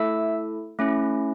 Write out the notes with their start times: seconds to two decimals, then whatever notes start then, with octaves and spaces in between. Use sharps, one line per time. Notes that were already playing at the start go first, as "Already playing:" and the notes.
Already playing: A3 E4 A4 E5 E6
0.79 A3 C#4 E4